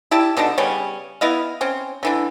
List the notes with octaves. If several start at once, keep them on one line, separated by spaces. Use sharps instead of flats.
E4 G4 D5 A5
B2 D3 D#4 A5
C#3 G3 B3 C#4
B3 E4 D#5 F5
C4 C#4
D3 E3 D4